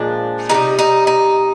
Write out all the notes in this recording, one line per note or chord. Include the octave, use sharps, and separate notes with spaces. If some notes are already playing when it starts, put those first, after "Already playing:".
Already playing: A#2 F3 G#3 D4
C3 D#3 G3 D#4
D#4
D#4